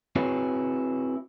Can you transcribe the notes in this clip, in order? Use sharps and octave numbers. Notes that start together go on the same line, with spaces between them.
C4 E4 F#4 G#4 B4 C#5